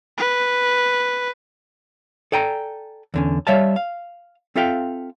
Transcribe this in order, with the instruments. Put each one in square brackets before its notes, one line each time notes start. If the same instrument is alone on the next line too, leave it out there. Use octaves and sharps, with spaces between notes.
[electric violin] B4
[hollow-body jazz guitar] A4 D5 G5 G#5 A#5
E2 D3 C#4
G3 C#5 E5 F5 A5
F5
C4 F4 A4 E5 F5 G5